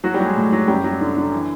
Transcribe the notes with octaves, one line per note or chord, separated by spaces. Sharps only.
F#3 F#4
G3 G4
F#3
G#3 G#4
A2
F#3
F#2 G3 G4
F#3
D3
D3
E3